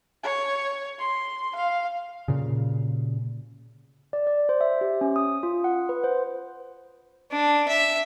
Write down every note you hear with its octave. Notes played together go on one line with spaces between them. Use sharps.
C#5
C6
F5
A#2 C#3
D5
D5
C5
E5
G4
C#4
D#6
F4
F#5
B4
C5
D4
E5